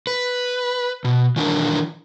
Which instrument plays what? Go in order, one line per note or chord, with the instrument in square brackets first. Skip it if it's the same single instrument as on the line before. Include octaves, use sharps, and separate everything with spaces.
[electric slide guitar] B4
B2
D#3 E3 F#3 D4 A#4